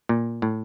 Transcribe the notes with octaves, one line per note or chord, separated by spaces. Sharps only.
A#2
A2